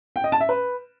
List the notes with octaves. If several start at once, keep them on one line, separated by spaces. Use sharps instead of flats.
G5
D#5
A5
E5
B4